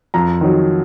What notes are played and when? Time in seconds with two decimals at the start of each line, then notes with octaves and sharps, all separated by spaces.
0.14 F2 A#5
0.41 D#3 F#3